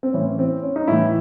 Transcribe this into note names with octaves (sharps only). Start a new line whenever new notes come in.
C4
A2 E3 C#4
C4
C#4
D#4
A2 E3 E4